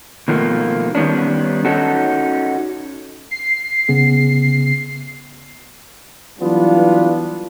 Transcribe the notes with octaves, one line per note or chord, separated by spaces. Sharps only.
B2 D#3 F3 A3 A#3
D#3 G3 B3 C#4 D4
C#4 D#4 F#4 A4
C7
C#3 B3 G#4
E3 F#3 G3 B3 D4 F4